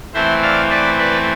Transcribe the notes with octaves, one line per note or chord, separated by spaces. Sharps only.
E3 A3 C4 C5 E5
D5 F5
B4 D5
B4 D5